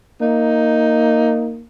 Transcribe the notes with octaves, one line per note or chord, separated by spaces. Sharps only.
A#3 D#4